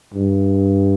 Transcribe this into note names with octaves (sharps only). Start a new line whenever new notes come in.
G2